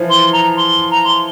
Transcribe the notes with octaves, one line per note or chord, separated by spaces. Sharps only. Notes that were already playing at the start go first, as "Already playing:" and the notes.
Already playing: E3 F3
C6
A#5
C6
A#5
C6